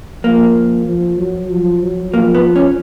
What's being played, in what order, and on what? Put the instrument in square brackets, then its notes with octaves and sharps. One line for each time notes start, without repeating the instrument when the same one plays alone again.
[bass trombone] F3 [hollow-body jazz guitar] A#3
[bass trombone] F3
F#3
F3
F#3
[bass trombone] F3 [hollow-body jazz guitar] A#3
[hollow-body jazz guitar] B3
C#4